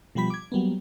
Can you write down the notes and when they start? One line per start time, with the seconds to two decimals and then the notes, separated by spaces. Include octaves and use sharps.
0.15 B2 F3 G3 G4 B5 B6
0.30 D6 G#6
0.52 F#3 G3 A#3 B3